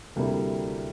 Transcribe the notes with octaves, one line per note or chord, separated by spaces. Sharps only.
D2 C3 G3 A#3 E4